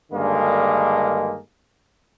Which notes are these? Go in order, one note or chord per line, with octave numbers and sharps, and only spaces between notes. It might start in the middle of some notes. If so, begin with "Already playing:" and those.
G2 D3 D#3 G#3 A#3